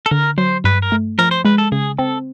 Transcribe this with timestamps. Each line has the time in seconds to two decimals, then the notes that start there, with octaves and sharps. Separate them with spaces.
0.06 A4
0.11 D3 A#4
0.38 F#3 C5
0.64 G2 B4
0.82 A#4
0.92 A3
1.19 F3 A#4
1.31 C5
1.45 G#3 B4
1.58 A4
1.72 C#3 G#4
1.98 C4 A4